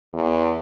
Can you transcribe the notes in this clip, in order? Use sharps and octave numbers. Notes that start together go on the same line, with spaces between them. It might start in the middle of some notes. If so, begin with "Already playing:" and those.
E2